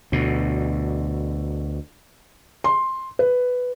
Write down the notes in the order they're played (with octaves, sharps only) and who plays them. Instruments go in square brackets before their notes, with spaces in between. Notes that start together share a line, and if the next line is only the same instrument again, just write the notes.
[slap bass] D2 B2
[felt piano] C6
B4